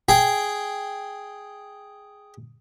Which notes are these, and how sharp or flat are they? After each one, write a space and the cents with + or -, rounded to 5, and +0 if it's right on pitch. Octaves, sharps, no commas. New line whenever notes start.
G#4 +0 G5 +0